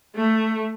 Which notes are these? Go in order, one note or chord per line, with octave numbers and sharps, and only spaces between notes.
A3